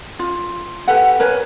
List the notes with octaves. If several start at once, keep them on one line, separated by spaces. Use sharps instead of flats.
F4
G4 A4 B4 F#5
A#4 B4 C#5 G#5